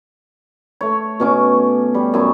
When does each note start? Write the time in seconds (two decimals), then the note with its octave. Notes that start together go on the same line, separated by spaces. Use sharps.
0.81 A3 C#5
1.20 B2 C#4 D6
1.94 G3
2.14 F#2 G#5 D6